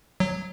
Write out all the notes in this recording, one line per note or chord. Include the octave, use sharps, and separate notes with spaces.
F#3